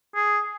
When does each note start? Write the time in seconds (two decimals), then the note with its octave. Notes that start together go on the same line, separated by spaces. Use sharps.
0.15 G#4